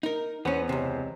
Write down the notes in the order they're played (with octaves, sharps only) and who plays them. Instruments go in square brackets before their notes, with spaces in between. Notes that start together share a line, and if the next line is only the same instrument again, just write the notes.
[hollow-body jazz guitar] D#4 A#4
[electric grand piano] E2 C5 [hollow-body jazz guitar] B3 C#4
[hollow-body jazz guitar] C#2 C3